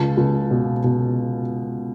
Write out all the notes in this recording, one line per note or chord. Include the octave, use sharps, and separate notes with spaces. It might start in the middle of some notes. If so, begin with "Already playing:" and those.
Already playing: C#2 A5
C#2
B2
B2